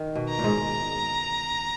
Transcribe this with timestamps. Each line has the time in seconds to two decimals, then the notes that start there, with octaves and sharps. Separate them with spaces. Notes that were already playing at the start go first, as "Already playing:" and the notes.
Already playing: D#3
0.15 B2
0.29 A#5
0.39 A#2
0.44 G#2